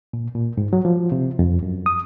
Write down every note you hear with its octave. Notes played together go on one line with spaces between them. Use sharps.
A#2
A#2
G#2
F#3
F3
C3
F2
F#2
D#6